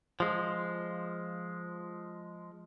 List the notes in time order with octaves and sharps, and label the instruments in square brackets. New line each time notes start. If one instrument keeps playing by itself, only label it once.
[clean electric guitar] F3 G#3